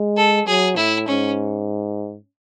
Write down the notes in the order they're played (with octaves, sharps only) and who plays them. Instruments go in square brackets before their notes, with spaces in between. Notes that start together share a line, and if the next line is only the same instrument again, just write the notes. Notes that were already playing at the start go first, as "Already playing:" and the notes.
Already playing: [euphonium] G#3
[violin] A4
[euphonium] F#3 [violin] G#4
[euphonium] A2 [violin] E4
[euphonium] G#2 [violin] C#4